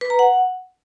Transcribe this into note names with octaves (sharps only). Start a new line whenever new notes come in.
B4
A#5
F#5